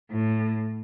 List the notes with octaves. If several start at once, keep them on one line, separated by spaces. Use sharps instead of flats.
A2